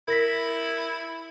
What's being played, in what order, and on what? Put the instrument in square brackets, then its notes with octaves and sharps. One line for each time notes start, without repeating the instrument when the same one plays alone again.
[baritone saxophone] E4 [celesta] A#4 A#6 B6